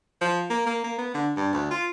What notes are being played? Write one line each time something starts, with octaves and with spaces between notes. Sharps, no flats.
F3
A#3
A#3
A#3
B3
D3
G2
D2
F4